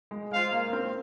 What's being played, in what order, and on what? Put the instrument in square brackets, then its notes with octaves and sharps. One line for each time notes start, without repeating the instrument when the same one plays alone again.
[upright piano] G#3
[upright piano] G#3 [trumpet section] F4 C5 F5
[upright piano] A#3
A#3
C4